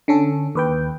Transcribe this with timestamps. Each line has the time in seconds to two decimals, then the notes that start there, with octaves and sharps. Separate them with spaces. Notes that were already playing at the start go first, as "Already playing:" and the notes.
0.08 D3 C#4 A4
0.55 D#2 B4 G5